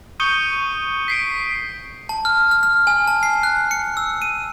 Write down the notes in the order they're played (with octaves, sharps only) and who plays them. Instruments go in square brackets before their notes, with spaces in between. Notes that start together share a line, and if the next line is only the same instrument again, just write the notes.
[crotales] C#6 D#6 G6 C#7 D#7 G7
B6 C7 D7
[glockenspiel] A5
F6
F6
F6
G#5
A5
C7
F#6
C#7
E6
D#7